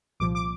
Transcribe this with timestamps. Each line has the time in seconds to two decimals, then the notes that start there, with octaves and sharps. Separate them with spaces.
0.20 C2 A#2 F3 D6
0.35 D6